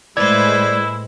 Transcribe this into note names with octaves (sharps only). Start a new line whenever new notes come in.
A2 G#3 E4 B4 C5 D5 G#6